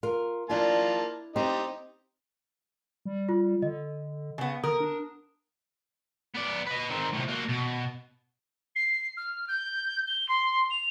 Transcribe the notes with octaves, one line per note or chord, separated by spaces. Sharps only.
F4 A#4
A#3 D4 E4 F4 A5
C4 D#4 G4 D#5
G3
F4
D3 D#5
C#3 B3
D3 A#4 D#6
D4
B3 D5
B4 D#5
D#3 C4
A2 C3
A#3 F#4
B2
C7
F6
G6
G7
C6
F7